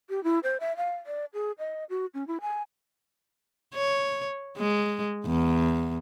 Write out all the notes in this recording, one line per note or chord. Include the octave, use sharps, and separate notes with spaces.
G4
E4
C5
E5
F5
D5
G#4
D#5
F#4
C#4
E4
G#5
C#5
G#3
E2